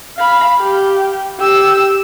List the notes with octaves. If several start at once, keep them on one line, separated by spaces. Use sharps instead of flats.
F5 B5
G4
G4 E6